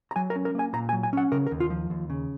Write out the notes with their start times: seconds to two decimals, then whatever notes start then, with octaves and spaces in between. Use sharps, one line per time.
0.11 A#5
0.16 F#3 G#5
0.30 A#4
0.36 C#4
0.45 A#4
0.55 A#3 G#5
0.73 A#2 A#5
0.89 G#5
0.93 F#3
1.03 G#5
1.13 C#4 F#5
1.32 C#3 A#4
1.47 A#4
1.51 D#2
1.60 F4
1.70 F3
1.90 D#2
2.10 C#3